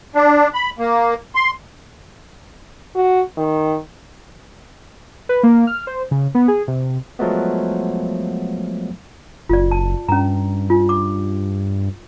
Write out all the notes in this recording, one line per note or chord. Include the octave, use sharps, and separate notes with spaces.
D4
B5
A#3
C6
F#4
D#3
B4
A#3
F6
C5
C#3
B3
G#4
C3
F3 F#3 G#3 A3 B3
F#1 F4 D5
A5
G2 C#4 A#5
D4 F4
D6